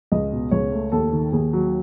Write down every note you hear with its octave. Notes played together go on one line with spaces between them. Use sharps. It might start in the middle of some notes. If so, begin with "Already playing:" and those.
C#2 D#5
B2
C#2 C#5
A3
D#2 A4
D#3
D#2 G#4
F#3